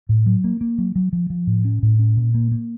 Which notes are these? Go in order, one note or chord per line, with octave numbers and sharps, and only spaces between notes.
A2
F#3
A#3
A#3
F#3
F#3
F3
F3
A2
C#4
A2
C#4
A#2
A#3
A#3